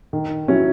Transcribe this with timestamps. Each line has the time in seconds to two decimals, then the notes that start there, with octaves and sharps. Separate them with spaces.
0.13 D#3
0.48 F#3 C#4 E4